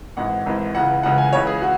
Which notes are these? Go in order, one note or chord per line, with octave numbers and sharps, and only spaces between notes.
G#1 G#2 E3 F#5
G#1 G#2 E3
C#2 C#3 E3 F#5
C#2 C#3 E3 F#5
G#5
C#2 C#3 E3 C#5
G#4
F#4